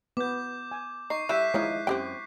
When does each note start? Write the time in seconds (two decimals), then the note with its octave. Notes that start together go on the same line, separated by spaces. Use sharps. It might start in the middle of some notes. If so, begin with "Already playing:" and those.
0.17 B3 D6 G6
0.71 G#5
1.10 D#4 C#6 C7
1.29 G3 E4 E5 F#6 G6 B6
1.54 D#3 F3 G#3 D#4 E4 C#5
1.87 F#2 C4 G4 G5